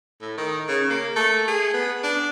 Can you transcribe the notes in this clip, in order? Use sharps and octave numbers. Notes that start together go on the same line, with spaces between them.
A2
D#3
C#3
A#3
A3
G#4
B3
D4